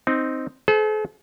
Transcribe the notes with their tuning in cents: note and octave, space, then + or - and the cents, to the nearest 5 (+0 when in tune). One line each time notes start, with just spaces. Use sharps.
C4 +0 D#4 +0
A4 -45 C5 -25